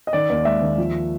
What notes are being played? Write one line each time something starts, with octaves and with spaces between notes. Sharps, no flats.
D#5
D#3 D5
D#2
G#3 E5
D#2
F3